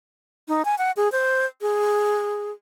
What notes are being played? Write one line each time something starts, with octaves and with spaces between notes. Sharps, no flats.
D#4
G#5
F#5
G#4
C5
G#4